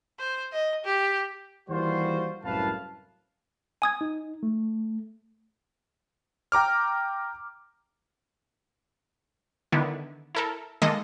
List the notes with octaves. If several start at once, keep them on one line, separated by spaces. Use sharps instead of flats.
C5
D#5
G4
D#2 E3 G3 F4 F#4 C5
C2 F#2 A2 B4 F5 A5
G#5 D#6 G#6
D#4
A3
G5 A#5 D6 F6
D3 D#3 B3 E4
E4 A4 A#4
D#3 G#3 A#3 A4 D#5